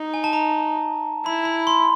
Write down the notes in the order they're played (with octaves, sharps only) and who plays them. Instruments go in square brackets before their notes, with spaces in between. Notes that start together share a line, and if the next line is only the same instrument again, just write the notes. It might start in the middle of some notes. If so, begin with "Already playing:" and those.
Already playing: [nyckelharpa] D#4
[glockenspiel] G#5
A5
A#5
[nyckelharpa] E4 [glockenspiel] B5
[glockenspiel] B5
C6